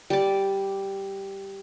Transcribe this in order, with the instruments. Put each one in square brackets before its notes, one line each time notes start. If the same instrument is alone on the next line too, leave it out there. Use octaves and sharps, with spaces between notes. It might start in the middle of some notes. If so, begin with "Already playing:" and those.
[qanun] G3 D5